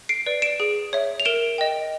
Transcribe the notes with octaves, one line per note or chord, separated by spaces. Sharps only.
C7 D7
B4 D5
D7 E7
G#4
C#5 E5
F7
A#4 D7 E7
D#5 G5